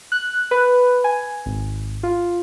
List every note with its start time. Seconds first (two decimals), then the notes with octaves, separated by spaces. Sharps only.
0.12 F#6
0.51 B4
1.04 G#5
1.46 G#1
2.03 F4